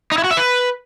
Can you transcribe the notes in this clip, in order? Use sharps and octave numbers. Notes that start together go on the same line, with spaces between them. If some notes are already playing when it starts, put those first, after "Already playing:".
D#4
E4
F#4
E5
B4